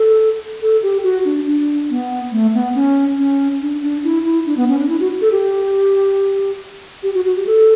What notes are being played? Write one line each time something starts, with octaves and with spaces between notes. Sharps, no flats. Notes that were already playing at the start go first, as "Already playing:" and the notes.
Already playing: A4
A4
G4
F#4
D4
D4
B3
A3
B3
C#4
C#4
D4
D4
E4
E4
D4
B3
C#4
D4
E4
F#4
A4
G4
G4
F#4
F#4
G4
A4